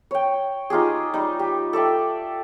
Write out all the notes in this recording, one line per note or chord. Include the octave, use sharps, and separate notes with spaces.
C#5 G5
D#4 F4 G4 G#4
G3 D#4
G4
A4 D5 E5 G5